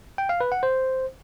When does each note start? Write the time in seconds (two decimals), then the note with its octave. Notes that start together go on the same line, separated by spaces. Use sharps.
0.18 G5
0.29 F5
0.41 B4
0.52 F#5
0.63 C5